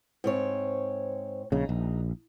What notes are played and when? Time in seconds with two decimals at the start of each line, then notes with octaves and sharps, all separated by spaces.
0.24 G#2 C4 C#5
1.52 A#1 C#3 D#4
1.69 A#1